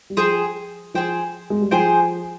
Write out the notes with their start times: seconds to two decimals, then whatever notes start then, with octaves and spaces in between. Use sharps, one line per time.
0.10 G3
0.17 F3 G#4 C5 G5
0.94 F3 G#4 C5 G5
1.50 G#3
1.61 G3
1.71 F3 G#4 C5 G5